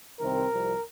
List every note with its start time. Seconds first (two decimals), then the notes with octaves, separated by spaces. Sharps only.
0.20 C2 C3 D#3 C4 A#4
0.51 C2 C3 F3